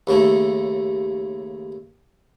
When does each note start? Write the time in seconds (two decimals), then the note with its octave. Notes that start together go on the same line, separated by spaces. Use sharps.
0.07 D#2 C#3 A3